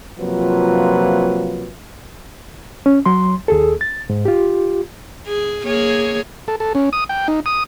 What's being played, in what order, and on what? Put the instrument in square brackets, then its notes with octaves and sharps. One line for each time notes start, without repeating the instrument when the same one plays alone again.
[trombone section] C3 F3 F#3 A#3 F4 B4
[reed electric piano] C#4
F#3 C6
D#2 G#4 A4
A6
G#2
F4 G4
[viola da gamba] G#4
A#3 G#4 C#5
[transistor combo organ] A4
A4
C#4
D#6
G5
D#4
D#6